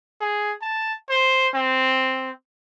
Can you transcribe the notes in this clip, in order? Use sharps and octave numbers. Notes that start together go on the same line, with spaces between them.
G#4
A5
C5
C4